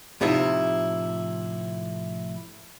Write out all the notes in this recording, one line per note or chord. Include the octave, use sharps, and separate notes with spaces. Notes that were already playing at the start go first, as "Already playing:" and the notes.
A2 C3 F3 D#4 E4